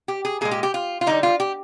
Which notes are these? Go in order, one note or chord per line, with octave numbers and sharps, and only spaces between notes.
G4
G#4
A#2 G#3 G#4
G4
G4
F4
F4
D3 G3 D#4
F4
G4